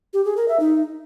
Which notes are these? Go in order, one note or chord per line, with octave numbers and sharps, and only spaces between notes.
G4
G#4
A#4
E5
D#4